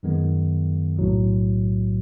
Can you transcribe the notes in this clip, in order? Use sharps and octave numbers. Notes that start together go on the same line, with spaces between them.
F#2 D#3 G#3 B3
B1 A2 F#3